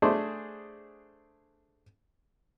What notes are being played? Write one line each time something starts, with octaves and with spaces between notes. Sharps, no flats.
A3 D4 G#4 C5